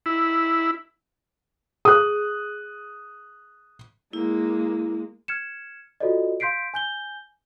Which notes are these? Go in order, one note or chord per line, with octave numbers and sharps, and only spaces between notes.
E4
G#4 D#6 F#6
G#3 A#3 E4
F6 G#6 C#7 E7
F4 F#4 A4 C5 D5 D#5
F5 C6 G6 B6 C7 D7
G#5 G6 G7